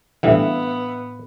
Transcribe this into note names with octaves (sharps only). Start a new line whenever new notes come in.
A2 D3 E3 G3 B3 E5 F5